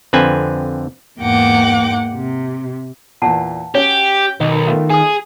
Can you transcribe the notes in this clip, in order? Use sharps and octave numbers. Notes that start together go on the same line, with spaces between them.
F2 D3 C4 B4 G#5
E2 G#2 A#3 F#5 G5 D6
C3
E2 A#2 F#5 A5
C#4 F#4 G4 C#5 G5
B1 D#3
A3 B3 F4
G#4 G#5 D#6